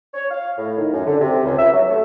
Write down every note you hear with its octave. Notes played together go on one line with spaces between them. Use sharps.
C#5
F5
A2
D#3
F#2
D3
C3
C#2
E5
F#3
A3